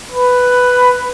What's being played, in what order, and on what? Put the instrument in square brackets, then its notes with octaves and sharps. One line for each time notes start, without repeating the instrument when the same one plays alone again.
[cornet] B4